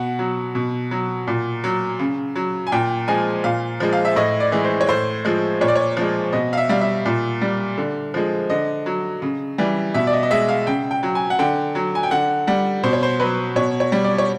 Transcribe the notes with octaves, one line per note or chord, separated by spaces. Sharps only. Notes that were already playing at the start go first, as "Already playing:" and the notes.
Already playing: B2 F#5
F#3
B2
F#3
A#2
F#3
C#3
F#3
G#5
A#2 G5
F3 G#3 G#5
A#2 F5
F3 G#3
F5
E5
A2 D#5
D5
E3 G#3
C5
C#5
A2 C5
F3 G#3
A#2 C#5
D5
C#5
F3 G#3
B2 D#5
F5
E5
G3 F5
E5
A#2
G3
D3
F3 G#3
D3 D#5
F#3
C#3
E3 G3
B2 E5
D5
D#5
D#5
G#3 E5
F5
C#3 G5
G5
F#3
G#5
F#5
D3 G5
F#3
G#5
G5
D3 F#5
G3 F#5
B2 C5
C#5
C5
F#3 B4
B2 C#5
C#5
G3
D5
C#5